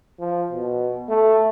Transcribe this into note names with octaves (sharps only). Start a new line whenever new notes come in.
F3
B2
A3